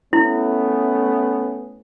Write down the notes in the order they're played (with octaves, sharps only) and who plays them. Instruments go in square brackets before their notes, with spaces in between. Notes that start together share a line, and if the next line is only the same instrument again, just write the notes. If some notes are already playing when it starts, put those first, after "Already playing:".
[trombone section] A3 B3 C#4 [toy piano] E4